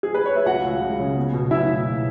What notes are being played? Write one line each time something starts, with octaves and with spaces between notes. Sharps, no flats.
G#4
B4
C#5
E5
C#2 F#4 F#5
C#2
C#2
C#3
B3
B2
B2 E4 E5
B2